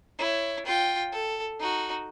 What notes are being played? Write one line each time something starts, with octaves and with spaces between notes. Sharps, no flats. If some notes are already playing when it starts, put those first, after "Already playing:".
E4 C#5
F4 G5
A4
D#4 F#4